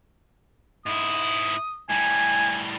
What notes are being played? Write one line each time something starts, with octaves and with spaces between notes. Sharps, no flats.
G#2 E4 D#6
A2 G3 G#5